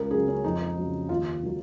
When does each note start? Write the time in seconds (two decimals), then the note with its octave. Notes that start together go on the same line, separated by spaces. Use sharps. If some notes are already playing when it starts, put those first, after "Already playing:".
Already playing: C#2 A#4
0.11 C#3 F#3 G#4
0.28 C#4
0.44 F2 D#4
0.77 C#3 F#3
1.09 D#2 F4
1.43 D#3 F#3